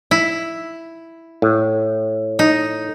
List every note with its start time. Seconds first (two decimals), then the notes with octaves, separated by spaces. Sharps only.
0.11 E4
1.42 A2
2.39 D#4